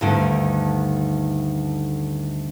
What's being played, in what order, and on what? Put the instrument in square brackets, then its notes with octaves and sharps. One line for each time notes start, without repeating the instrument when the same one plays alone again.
[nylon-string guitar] D2 G2 D3 D#3